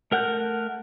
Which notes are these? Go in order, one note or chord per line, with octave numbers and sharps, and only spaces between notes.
A3 A#4 F#5 F#6 G6